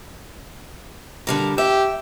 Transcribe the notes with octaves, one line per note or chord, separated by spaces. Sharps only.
D3 G3 A#4
G4 E5